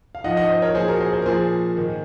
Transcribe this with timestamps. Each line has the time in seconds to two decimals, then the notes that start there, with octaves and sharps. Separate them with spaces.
0.15 F5
0.24 G#2 F3 D#5 F#5
0.37 D#5 F#5
0.49 C5 D#5
0.62 A#4 C#5
0.75 A#2 F3 G#4 C5
0.88 F#4 A#4
1.00 G#4 C5
1.13 G#4 C5
1.22 A#4
1.26 A#2 F3 G#4 C5
1.77 G#2 D#3